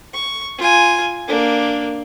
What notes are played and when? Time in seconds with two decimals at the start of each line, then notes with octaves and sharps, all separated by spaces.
0.14 C#6
0.58 F4 G#5
1.28 A#3 D4